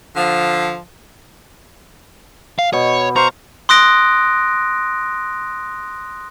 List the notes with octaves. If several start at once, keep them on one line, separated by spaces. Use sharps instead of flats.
D3 F3
F5
B2 C#5
C5 F5 A#5 C#6
C6 D#6 F#6 A#6 D7